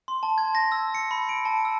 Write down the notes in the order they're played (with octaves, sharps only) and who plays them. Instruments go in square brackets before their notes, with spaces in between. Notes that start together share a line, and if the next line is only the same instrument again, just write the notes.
[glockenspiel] C6
A5
G#6
A#6
E6
C#7
B5
D7
A5
E6